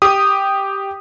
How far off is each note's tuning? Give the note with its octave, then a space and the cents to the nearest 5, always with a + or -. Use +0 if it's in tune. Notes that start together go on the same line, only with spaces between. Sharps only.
G4 +0 D#6 -10